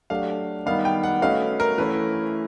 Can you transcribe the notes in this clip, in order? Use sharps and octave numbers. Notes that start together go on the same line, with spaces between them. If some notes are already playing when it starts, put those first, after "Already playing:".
F#3 A3 D4 G4 F5
D#3 G3 B3 D#4 F5
G5
F#5
A3 C#4 F#4 B4 D#5 F5
A#4
E3 A3 C#4 E4 B4